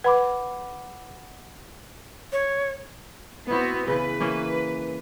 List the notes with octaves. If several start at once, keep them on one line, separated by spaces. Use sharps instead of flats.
B4 F#5 B5 D6
C#5
B3 C4 E4 F#4
C#3 E3 B4
E3 A#3 C#4